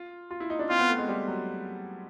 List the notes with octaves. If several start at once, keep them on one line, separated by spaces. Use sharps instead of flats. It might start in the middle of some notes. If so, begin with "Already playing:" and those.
Already playing: F4
F4
E4
D#4
D4
C4 F4
B3
A3
G#3
G3
F#3